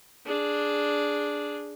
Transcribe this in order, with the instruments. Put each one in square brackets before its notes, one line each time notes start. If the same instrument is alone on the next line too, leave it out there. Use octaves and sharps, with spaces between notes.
[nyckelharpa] D4 G#4